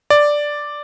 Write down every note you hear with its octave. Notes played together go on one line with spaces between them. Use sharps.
D5